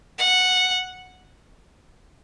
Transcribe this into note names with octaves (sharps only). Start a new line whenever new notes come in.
F#5